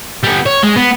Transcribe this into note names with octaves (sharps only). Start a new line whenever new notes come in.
G3 B3
C#5
G#3
B3